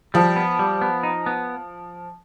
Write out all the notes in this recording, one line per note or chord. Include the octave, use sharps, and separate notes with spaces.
F3 G3
B3
G3
B3
D#4
B3